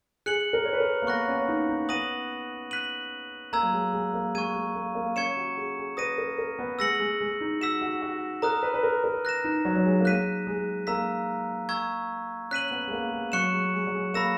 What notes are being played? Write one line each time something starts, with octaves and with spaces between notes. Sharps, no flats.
G#4 F#6 C#7 F#7
A#4
C#5
B4
A#4
A#3
B3 C#6 F#6 A#6
C#4
D#4
D#4
B3 D#6 A#6 D#7 F#7
F#6 B6 D#7 F#7
A#3 A#5 E6 G#6
F#3
G#3
G#3
A#3
G#3 C#6 G#6 D#7
G#3
A#3
A#3
C#4 C#6 G#6 C#7 E7
F#4
G#4
G#4
B4 D#6 A#6 D#7
A#4
A#4
B3
G#3 E6 A#6 C#7 F#7
G#3
G#3
D#4
F#4 E6 B6 E7
F#4
F#4
A#4 A#5 D#6 F#6
B4
B4
A#4
A#4
F#6 A#6 E7
D#4
F#3
F#3
G#3
A#3
G#3 F#6 B6 D#7
G#3
A#3 A#5 E6 B6
A#5 C#6 E6 G#6
C#4 F#6 B6 D#7 F#7
B3
G#3
A#3
G#3
F#3 C#6 F#6 C#7 E7
G#3
G#3
F#3
G#3
A#3 B5 E6 A#6 E7